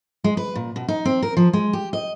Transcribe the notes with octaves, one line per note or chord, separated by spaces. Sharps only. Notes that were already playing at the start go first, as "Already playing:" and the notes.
G#3
B4
A#2
B2
D#4
C4
A#4
F3
G#3
G4
D#5